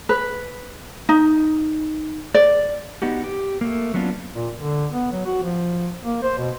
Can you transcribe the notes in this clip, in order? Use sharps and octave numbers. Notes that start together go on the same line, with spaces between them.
B4
D#4
D5
B3 D#4 F#4 G4
G4
A3 A#3
F#3 B3 C#4 D4 F4
A#2
D3
B3
F#3
F#4
F3
A#3
C5
B2